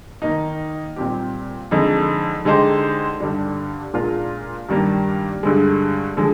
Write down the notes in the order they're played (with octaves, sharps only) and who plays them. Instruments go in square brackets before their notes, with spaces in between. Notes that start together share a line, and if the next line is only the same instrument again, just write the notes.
[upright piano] D#3 A#3 D#4
A#2 G3 C4 G4
F2 D3 G#3 D#4
D3 G#3 D#4 G4 C5
G2 D3 G3 D4
A#2 G#3 D4 F4 A#4
G2 D#3 G3 A#3 D4
G2 D3 G#3
D3 F3 G#3